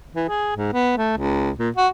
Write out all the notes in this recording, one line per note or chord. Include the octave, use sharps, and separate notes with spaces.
E3
G#4
G#2
B3
A3
C#2
A#2
F#4